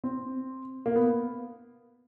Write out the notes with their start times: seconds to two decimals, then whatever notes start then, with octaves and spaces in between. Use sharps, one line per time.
0.04 C4
0.86 A#3
0.95 B3